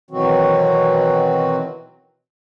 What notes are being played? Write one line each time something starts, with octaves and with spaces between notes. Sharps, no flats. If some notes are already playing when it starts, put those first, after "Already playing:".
B2 D#3 E3 F#3 C4 F#4